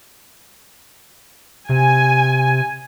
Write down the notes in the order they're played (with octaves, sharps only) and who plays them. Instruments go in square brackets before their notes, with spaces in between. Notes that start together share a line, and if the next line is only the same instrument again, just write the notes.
[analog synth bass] C3 [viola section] G#5